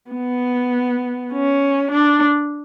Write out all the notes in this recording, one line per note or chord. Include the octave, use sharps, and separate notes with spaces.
B3
C#4
D4